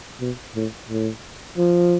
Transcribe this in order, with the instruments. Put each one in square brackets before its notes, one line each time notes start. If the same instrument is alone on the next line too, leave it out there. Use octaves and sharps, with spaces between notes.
[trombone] B2
A2
A2
F3